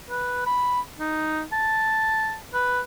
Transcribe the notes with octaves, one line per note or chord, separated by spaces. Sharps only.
B4
B5
D#4
A5
B4